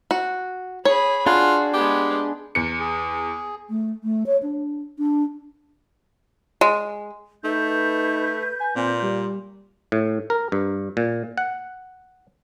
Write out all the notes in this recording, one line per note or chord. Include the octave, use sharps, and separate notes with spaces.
F#4
G#4 C#5 B5
D4 F4 F#4 G#4 F#5
G#3 B3 G4
E2 C#7
G#4
A3
A3
C#5
D4
D4
G#3
A3 D#4 B4 G6
G#5
A#2 C4
G3
A2
A#4
G2
A#2
F#5